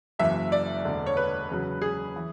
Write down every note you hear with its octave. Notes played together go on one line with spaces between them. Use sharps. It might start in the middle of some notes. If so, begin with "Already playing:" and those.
F#1 F#2 E3 E5
D5
E1 E2 D3
C#5
B4
E2 C#3 F#3
G#4
E3